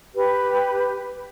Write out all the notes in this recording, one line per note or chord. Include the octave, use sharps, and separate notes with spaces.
G4 B4